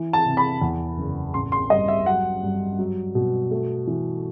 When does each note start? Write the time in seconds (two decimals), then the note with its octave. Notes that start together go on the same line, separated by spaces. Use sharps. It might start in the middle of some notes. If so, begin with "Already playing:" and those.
Already playing: E3
0.13 A5
0.26 C3
0.37 B5
0.61 E2
0.97 F#1
1.34 A1 C6
1.52 C6
1.70 G2 D#5
1.88 E5
2.06 F#3 F#5
2.43 G2
2.79 F#3
3.15 B2
3.51 A3
3.87 E3